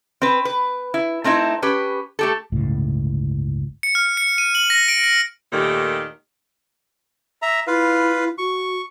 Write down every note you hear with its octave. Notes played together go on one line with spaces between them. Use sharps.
C4 B4
B4
E4
A3 C4 D#4 E4
C#4 G4 B4
A3 G4 A4
G1 C#2 A2
C#7
F6
C#7
D#7
F#7
A#6
D7
C#7
D#2 A#2 D#3 A3 G4
E5 A#5
E4 F4 B4 F5
F#4 C#6